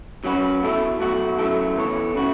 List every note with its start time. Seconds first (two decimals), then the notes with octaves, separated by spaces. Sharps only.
0.24 F#3 C#4 F#4 B4
0.62 B2 A3 E4 A4
1.00 B2 F#3 A3 F#4
1.38 F#2 F#3 A3 E4 A4
1.75 E3 B3 A4 C#5
2.15 C#3 A3 F#4